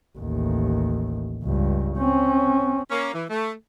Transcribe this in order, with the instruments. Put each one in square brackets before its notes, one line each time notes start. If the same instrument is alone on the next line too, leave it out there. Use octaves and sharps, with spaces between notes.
[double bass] A1 D#2
C#2 G2
C4 C#4
[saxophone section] A#3 C#4
E3
A3